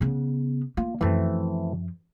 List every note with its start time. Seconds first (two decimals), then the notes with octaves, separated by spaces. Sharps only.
0.01 C#3 B3
0.77 A#3 F4
1.01 F#2 E3 F3 A3 C4